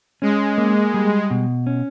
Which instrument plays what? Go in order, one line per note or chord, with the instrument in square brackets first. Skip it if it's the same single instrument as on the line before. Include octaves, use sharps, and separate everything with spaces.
[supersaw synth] G#3 [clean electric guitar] C#4
[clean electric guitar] A#3
G3
B2
C#4